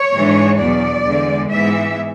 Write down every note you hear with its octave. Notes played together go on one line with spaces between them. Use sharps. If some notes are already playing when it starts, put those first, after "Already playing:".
Already playing: C#5
G#2 E3 G#3 D4
E2 B2 F#3 D5
E2 D3 G#3
G#2 E3 G#3 B3 E5